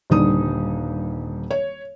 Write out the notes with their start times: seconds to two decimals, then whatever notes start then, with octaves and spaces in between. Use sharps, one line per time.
0.10 D#1 G2 D3 D#4 D#6
1.51 C#5